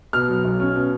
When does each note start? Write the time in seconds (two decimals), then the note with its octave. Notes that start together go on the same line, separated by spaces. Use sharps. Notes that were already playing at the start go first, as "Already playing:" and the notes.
0.13 B2 F6
0.28 F#3
0.44 B1
0.60 C#4
0.76 B2